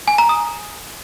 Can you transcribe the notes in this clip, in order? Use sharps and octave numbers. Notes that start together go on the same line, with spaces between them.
G#5
A#5
D#6